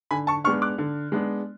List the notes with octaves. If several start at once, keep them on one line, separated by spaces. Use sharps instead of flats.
D3 G#5 B5
A5 C#6
G#3 B3 D4 C#6 F6
D6 F#6
D3
G#3 B3 D4